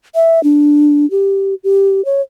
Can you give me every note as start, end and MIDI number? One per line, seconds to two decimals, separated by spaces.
0.15 0.42 76
0.44 1.09 62
1.11 1.55 67
1.64 2.04 67
2.05 2.21 73